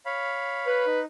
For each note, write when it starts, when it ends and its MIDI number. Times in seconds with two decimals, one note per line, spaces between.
0.06 0.86 73
0.06 0.86 77
0.06 0.86 83
0.67 1.01 71
0.86 1.05 63